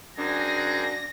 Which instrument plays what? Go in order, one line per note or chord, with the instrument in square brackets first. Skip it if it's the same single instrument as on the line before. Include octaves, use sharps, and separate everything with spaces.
[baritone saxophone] F#2 [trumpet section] C4 G#4 [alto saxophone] D4 [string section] A#6